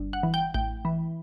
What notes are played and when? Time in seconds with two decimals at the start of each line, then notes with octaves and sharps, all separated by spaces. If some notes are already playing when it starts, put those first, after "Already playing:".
Already playing: G1
0.13 F#5
0.23 E3
0.34 G5
0.54 A1 G5
0.85 E3